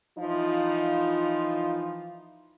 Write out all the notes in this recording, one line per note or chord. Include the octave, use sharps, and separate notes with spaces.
E3 F3 D#4 F4